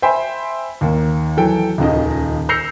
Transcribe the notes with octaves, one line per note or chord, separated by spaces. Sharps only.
C5 E5 G5 G#5 B5 C6
D#2 A#3
E3 F#3 A4 G5
D#1 C#2 D#3 D#5
E6 G6 A#6 C7 C#7 F7